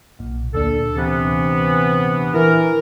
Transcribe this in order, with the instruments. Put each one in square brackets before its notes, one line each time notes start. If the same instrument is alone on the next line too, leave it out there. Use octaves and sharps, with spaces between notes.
[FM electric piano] B1 A#2
[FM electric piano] D2 A#2 D4 [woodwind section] A4
[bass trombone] C3 [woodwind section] E3 B3
[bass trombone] E3 [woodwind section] A#4